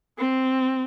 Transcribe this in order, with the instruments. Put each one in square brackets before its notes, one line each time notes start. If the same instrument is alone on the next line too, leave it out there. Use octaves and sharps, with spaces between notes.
[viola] C4